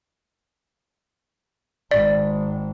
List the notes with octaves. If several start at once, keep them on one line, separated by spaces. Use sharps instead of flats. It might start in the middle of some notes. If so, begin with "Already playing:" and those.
G#1 D5